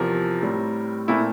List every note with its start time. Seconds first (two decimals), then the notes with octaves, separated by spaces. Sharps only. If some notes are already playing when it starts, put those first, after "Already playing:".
Already playing: E2 C3 F3 A#4
0.42 A2 G3 C4
1.08 A#2 A3 C4 E4